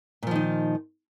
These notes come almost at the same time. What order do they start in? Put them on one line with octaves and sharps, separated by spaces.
A#2 F3 D#3 D#4